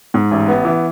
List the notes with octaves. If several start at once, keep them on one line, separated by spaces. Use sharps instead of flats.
G#2
A1
B3
E3